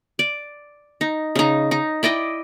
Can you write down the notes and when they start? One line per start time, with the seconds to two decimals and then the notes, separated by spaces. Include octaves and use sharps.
0.19 D5
1.01 D#4
1.36 C#3 D#4
1.71 D#4
2.03 E4 D5 D#5 G5